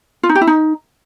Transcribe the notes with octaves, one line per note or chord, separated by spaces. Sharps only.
F4
D#4
G4
E4
D#4